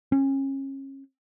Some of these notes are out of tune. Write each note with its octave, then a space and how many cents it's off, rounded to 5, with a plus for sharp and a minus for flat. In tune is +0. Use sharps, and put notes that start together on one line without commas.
C#4 -30